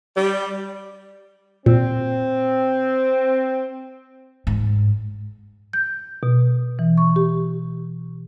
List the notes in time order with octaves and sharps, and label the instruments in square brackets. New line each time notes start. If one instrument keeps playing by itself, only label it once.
[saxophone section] G3
[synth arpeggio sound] A#2 [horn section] C4
[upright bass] G#2
[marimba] G6
B2
E3
C#6
G4